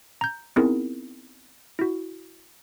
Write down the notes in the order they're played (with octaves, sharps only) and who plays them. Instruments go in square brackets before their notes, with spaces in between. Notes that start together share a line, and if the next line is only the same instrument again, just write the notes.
[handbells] A#5 G6
B3 C4 D#4 E4 G#4 A#4
E4 F#4